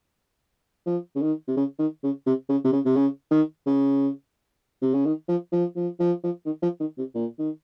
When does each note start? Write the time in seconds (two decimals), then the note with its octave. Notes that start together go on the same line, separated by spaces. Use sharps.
0.86 F3
1.16 C#3
1.21 D#3
1.48 C3
1.57 C#3
1.79 D#3
2.03 C#3
2.26 C3
2.49 C#3
2.64 C3
2.72 C#3
2.85 C3
2.96 C#3
3.31 D#3
3.66 C#3
4.82 C3
4.94 C#3
5.05 D#3
5.28 F3
5.52 F3
5.76 F3
6.00 F3
6.23 F3
6.45 D#3
6.62 F3
6.80 D#3
6.98 C3
7.15 A#2
7.39 D#3